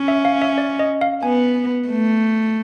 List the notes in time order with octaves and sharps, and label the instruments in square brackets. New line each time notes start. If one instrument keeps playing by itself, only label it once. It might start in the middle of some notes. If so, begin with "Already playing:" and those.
Already playing: [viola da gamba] C#4
[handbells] E5
F5
E5
D5
D#5
F5
[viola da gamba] B3 [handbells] G#5
[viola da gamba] A3